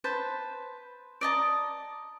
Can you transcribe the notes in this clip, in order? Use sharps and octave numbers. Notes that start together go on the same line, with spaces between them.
B4 C5 A5
D5 D#5 A5 A#5